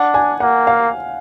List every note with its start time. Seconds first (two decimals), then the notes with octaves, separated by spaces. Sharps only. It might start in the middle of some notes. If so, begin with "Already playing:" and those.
Already playing: D4 F#5
0.14 G#5
0.40 A#3 F#5
0.67 F5